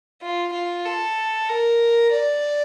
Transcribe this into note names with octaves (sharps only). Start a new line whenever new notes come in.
F4
F4
A4
A#4
D5